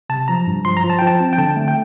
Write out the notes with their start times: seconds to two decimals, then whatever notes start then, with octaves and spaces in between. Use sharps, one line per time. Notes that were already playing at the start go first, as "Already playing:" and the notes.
0.09 C3 A5
0.28 F3 A#5
0.47 G2
0.65 F3 C6
0.77 A#5
0.84 F3
0.90 A5
0.99 F3 G5
1.07 A5
1.20 C4
1.33 G5
1.38 D3 A5
1.56 A3
1.68 G5